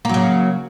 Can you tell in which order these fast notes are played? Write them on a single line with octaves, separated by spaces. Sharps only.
A#3 F#3 C#3